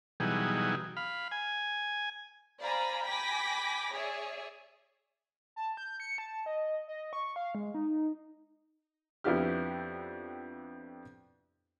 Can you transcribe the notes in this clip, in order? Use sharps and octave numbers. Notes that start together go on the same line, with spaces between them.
B2 E3 F#3 G3 D#4 G#4
F5 B5
G#5
C5 D5 F5 G#5 A#5 B5
G5 G#5 B5 D6 A#6 B6
G#4 C#5 D5 E5
A5
G6
C#7
A5
D#5
D#5
C#6
F5
G#3
D#4
F2 B3 D4 E4 G4 F6